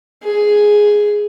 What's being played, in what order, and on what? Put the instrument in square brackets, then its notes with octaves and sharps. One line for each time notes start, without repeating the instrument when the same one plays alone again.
[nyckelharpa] G#4